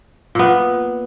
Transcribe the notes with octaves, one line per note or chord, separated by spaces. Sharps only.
A#2 B3